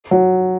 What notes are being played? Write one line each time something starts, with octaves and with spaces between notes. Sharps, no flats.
F#3